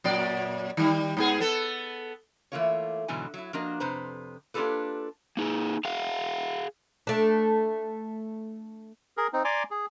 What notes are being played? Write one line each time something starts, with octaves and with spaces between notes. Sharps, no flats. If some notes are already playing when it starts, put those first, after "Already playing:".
F#2 A#2 D5
D#3 G3
G#2 B3 G#4
B3 A4
E3 F3 A3 A#3 F4 C#5
G#2 B2 D3 E3 F#3 G#5
F#3 E4
F3 A#3 D4 F#4 A#4 D#5
F2 C3 B4 C5 A#5
A#3 D4 F4 G4 A4 B4
A#3 D#4 G#4
G#4 F5 F#5
A3 D4
G#4 A#4
C4 D#4
D5 G#5 A#5 C6 D6
G#4